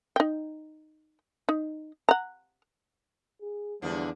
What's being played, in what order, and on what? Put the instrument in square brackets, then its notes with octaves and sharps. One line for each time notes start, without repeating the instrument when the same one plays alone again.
[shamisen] D#4 G5
D#4
F#5 A#5
[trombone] G#4
[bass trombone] E2 [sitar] D3 F3 D4 [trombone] G3